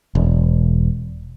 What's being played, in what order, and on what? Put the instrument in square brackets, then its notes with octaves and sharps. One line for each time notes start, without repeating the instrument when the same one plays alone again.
[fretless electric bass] E1